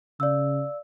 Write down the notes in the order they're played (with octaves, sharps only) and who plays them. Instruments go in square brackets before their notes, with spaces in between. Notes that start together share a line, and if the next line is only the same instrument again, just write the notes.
[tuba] C#3 [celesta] D5 F5 E6